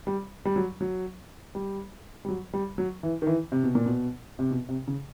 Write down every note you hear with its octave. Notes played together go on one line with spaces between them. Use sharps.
G3
G3
F#3
F#3
G3
G3
F#3
G3
F#3
E3
D#3
E3
C3
B2
A#2
B2
C3
B2
C3
C#3